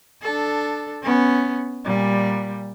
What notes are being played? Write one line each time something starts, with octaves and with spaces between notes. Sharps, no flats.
D4 A4
B3 C#4
A#2 G3